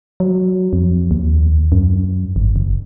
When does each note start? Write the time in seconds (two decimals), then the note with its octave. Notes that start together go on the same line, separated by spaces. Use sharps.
0.20 F#3
0.73 F2
1.11 D#2
1.72 F#2
2.36 G#1
2.56 F#1